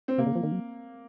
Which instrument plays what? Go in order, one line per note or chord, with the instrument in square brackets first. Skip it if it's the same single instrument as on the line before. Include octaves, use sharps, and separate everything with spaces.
[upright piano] C4
[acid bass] C3 [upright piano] A#3
[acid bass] C#3
F3
D#3
F#3